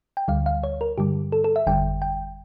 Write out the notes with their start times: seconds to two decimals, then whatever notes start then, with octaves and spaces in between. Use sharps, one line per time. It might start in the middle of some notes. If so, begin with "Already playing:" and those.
0.17 G5
0.28 D2 D3 G3 F5
0.46 F5
0.64 C#5
0.81 A#4
0.98 G2 D3 G3 G4
1.32 A4
1.44 A4
1.56 E5
1.67 G1 F2 D3 G3 G5
2.02 G5